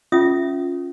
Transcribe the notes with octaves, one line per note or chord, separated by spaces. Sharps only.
C#4 F4 G#4 E5 D#6